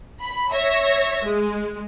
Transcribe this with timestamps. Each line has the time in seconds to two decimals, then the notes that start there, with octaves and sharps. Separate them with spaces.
0.23 B5
0.51 C#5 E5 A#6
1.24 G#3